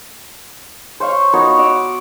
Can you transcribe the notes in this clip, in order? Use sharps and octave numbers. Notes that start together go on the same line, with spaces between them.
C5 C#5 F5 C#6
B3 D#4 F#4 C#5
F#5 D6 E6